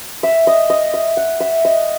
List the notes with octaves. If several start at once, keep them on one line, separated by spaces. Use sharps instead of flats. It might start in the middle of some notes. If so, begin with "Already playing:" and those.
E5
D#5
D#5
E5
F#5
E5
D#5